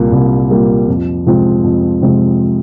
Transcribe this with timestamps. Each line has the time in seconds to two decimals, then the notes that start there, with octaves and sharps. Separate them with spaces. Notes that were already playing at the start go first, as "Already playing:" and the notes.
Already playing: C2 A#2 G3 A#3
0.12 C2
0.50 A#2 G3 A#3
0.88 F2
1.26 C3 F3 G#3 C4
1.64 F2
2.02 C3 F3 G#3 C4